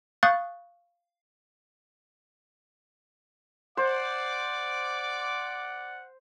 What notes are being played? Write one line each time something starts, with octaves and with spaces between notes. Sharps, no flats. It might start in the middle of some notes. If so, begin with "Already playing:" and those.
F5 C#6 D#6 F#6 G6 A6
C5 D5 F#5 D6